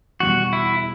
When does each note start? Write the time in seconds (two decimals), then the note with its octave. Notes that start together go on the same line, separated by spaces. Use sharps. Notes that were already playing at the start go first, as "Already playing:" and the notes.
0.20 E2 B2 G3 F#4
0.53 E4